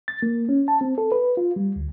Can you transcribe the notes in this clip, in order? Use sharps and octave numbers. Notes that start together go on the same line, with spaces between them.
A6
A#3
C#4
A5
C4
A4
B4
F4
G3
D2